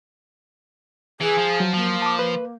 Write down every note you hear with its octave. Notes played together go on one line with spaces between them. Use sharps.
E3 G#4
F3
F#3
F3 A#3
A5 D6
B4